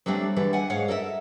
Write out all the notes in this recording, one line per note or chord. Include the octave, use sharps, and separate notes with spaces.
F#3 G3 A3 C4 D4
D3 E3 F#3 G3 A4
F#5 G#5
G#2 C#5 F5 F#5
A4 A#4 D5 E5